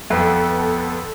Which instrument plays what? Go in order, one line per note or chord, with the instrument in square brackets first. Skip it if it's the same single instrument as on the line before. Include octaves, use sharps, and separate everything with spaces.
[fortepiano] F2 [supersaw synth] B3 A4